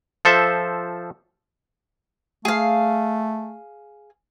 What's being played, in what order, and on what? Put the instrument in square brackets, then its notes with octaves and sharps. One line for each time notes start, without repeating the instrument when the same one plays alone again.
[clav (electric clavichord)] F3 A4 C5 E5
[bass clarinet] A3 [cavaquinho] G#4 F5